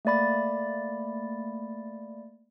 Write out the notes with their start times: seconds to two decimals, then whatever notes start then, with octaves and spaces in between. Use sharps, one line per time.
0.05 A3 A#3 D5 B5 A6